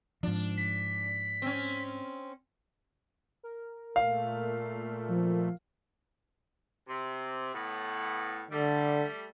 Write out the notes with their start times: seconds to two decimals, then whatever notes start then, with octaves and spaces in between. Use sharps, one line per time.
0.23 G#2 F3 D4
0.58 B6
1.42 C4 C#4
3.43 A#4
3.96 A#2 A3 F5
5.10 F3
6.88 C3
7.55 A2 B3
8.51 D3 G3 A3